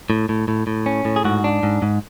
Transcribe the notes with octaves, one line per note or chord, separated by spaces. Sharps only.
A2
A2
A2
A2
C#4
A2
G#4
G#2 F#4
D4
G#2
G#2